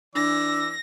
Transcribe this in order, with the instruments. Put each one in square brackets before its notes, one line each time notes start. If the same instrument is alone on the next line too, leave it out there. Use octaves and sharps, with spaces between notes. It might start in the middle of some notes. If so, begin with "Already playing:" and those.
[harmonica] E3 D5 E6 [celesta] D4 [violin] A#6